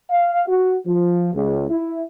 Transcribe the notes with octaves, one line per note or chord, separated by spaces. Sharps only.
F5
F#4
F3
C#2
E4